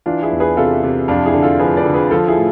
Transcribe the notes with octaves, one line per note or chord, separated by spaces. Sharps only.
E3 D4 F4
E4 G#4
E2
G#4 B4
C3 F4 A4
C3
F2 D4 F4
E4 G#4
D3
F4 A4
F3 G#4 B4
B4 D5
D3
G#4 B4
F3 F4 A4
E4 G#4
A2